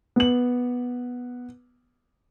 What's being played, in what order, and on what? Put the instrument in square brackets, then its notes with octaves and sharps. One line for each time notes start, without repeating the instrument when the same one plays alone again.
[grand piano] B3 F#7